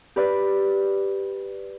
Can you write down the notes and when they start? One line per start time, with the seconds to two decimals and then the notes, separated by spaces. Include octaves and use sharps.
0.16 G4 B4 D5